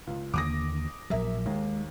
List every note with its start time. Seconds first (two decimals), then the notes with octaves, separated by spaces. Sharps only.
0.07 C#2
0.34 D#2 D3 A#3 D6 D#6 A#6
1.10 A#1 F#3 A#4 E5
1.46 D#2 D#3 G#3